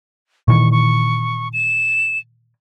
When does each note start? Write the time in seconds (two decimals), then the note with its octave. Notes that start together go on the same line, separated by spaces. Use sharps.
0.48 A#2 D#3 E3 C#6
0.72 C#6
1.53 E7